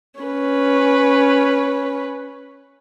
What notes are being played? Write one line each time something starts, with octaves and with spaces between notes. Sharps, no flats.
C#4 B4